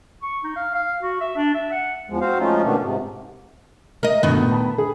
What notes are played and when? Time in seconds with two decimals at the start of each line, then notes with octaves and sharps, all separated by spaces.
0.22 C#6
0.44 D#4
0.56 F5
0.74 F5
1.02 F#4
1.21 E5
1.36 D4
1.54 E5
1.72 F#5
2.10 E2 F3 G#3
2.21 C4 F#4 C5 F5
2.39 F3 G#3 A3 C#4 D#4 F4
2.64 B2 D#3 A3 B3 C#4 D4
2.81 G#2 C3
4.03 A#4 D#5
4.23 G1 D2 B2 D#3 B3
4.37 A#2
4.52 A5 B5
4.78 G#4